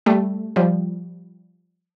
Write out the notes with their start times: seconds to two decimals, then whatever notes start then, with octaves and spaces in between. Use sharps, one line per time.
0.06 G3 A3
0.56 F3 G3